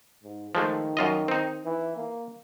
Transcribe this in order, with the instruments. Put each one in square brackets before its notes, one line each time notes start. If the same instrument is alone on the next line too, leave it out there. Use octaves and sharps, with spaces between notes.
[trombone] G#2
[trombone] D#3 [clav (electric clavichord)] F3 G#3 A3
[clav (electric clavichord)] F#2 F4 D#5
C4 D#4
[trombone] E3
A#3